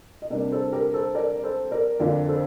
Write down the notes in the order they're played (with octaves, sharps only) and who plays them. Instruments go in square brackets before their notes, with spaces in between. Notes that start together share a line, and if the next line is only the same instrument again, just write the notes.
[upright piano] D#5
[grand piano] C3 G3 A#3 D4 [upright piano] A#4 D5
[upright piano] A4 C5
G4 A#4
A4 C5
A#4 D5
A4 C5
A#4 D5
[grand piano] F2 D3 F3 A#3 D4 [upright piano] A#4 D5
[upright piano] A4 C5